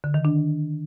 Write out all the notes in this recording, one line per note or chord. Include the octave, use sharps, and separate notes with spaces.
D3
D#3
D4